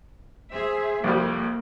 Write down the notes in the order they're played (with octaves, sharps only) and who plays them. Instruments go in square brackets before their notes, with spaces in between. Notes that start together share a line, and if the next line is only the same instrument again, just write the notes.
[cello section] G#4 C5 E5
[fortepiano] C2 F2 G3 [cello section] A#3